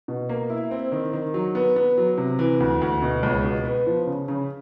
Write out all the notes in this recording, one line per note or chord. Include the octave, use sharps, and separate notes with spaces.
B2
A#3
E4
C4
D#3
D#3
F#3
B3
B3
F#3
C3
E3
D2
D2
B2
C#2
B2
B3
F3
C#3
C#3